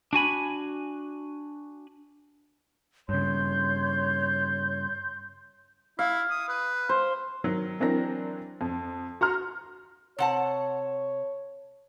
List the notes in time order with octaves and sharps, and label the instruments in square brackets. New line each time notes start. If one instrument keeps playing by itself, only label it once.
[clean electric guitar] D4 F#4 G#5 B5
[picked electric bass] G2 C#3 [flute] C#5 [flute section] C6 G6
[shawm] E4 [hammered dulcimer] F5
[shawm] D#6
B4
[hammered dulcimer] C5
[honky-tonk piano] D#3 F#3
E3 F#3 C4 D4 A#4 A#6
F2
F#4 A#5 C6 F6
[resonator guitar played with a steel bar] C3 F#5 A5 [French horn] C#5